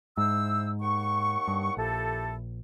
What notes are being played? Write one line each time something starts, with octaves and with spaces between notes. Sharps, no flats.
G#2 E4 C5 E6
D#2 F#5 C#6
G2
A#1 E4 G4 A4